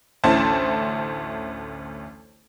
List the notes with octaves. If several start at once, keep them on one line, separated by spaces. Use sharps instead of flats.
A1 D2 C#4 E4 C5 A5